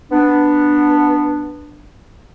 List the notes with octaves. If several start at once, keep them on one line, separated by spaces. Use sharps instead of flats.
B3 D4